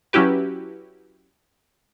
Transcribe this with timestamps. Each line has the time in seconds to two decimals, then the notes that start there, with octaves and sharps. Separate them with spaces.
0.13 F#3 C#4 E4 F#4 G4 B4